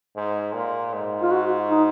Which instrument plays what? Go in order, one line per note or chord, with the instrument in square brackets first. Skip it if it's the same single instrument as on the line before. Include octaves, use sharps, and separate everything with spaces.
[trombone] G#2
A#2
G#2
[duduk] F4
F#4
D#4